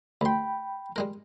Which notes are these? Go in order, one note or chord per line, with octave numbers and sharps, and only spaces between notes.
D2 G5 B5 C6
G3 G#3 A#4